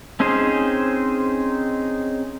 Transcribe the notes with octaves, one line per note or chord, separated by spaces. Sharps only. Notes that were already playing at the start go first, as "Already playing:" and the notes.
C4 C#4 D#4 G#4 C5